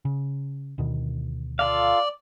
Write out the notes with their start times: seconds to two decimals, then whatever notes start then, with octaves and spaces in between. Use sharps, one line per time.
0.05 C#3
0.78 D2 B2 D#3
1.59 F4 A4 D5 F5